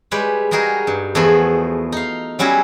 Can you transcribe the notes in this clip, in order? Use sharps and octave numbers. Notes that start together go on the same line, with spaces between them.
G3 G#3 G4 B4 C#5
G3 D#4 F#4 G#4 A#4
G2
E2 F3 A3 F#4 G#4 B5
D#4 F5
F#3 G3 C#4 E4 F#4 G#4